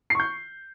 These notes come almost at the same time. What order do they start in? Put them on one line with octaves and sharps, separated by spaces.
C7 C#6 G6